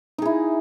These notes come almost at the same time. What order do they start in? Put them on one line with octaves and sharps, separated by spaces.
D#4 G#4 E4